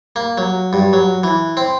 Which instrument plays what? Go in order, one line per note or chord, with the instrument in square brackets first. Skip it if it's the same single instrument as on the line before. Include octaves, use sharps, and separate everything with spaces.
[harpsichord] A#3
F#3
G2
F#3
E3
C4